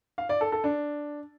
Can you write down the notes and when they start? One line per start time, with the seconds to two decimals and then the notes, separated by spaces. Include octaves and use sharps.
0.18 F5
0.29 D5
0.41 A4
0.52 A4
0.64 D4